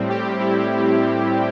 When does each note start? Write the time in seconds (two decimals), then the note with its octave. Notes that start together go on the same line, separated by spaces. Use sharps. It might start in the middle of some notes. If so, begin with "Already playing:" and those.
Already playing: A2 G3 C4
0.10 G4
0.40 E4